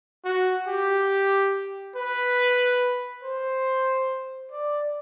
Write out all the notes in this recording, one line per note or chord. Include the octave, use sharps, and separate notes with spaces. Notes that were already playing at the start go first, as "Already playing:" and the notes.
F#4
G4
B4
C5
D5